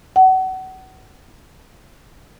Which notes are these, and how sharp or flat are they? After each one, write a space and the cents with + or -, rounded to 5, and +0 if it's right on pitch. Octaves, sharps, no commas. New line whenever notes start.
F#5 +30